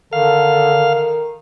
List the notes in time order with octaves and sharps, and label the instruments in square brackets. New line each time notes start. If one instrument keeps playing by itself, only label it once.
[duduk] D3 [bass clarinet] D#3 [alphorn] A4 [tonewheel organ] F5